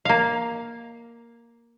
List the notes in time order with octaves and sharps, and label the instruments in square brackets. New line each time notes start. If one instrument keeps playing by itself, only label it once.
[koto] A#3 F5